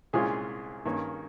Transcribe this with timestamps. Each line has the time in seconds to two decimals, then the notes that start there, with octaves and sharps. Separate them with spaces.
0.13 C2 A#2 G#3 C#4 F4 G#4
0.85 G2 D#3 A#3 C#4